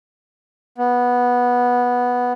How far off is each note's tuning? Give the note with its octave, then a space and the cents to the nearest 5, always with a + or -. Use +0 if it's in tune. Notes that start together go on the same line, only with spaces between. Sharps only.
B3 -10